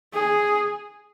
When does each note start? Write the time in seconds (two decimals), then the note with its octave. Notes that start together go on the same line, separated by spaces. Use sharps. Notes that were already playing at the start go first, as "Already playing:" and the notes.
0.13 G#4